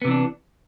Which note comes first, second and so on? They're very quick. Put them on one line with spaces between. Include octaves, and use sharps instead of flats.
B3 C3 E3 D4